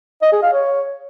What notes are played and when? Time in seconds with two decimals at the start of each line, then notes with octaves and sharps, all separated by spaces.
0.22 D#5
0.32 G#4
0.42 F5
0.53 C#5